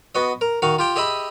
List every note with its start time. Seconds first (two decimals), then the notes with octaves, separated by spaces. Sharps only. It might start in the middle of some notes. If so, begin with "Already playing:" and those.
0.15 B3 F#4 D#5
0.41 A#4
0.62 D#3 F#4 F5
0.79 F4 G4 G5
0.96 G4 G#4 D#5 E5 B5